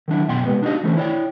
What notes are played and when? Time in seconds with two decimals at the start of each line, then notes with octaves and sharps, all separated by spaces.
0.08 D#3 F#3 D4 E4
0.28 F#2 B2 G5 C6
0.46 C3 G3 G#3 B3
0.62 D4 D#4 F#4 G4 D5 D#5
0.83 D3 E3 A3 C#4 C5
0.97 E4 C#5 D5 G5